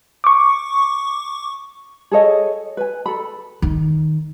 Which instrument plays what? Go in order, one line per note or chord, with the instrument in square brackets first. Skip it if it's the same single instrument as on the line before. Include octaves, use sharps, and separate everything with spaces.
[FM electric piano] C#6 D6
[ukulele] G#4 A4 C#5 D#5
B4 G#5
A4 B5
[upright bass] D#3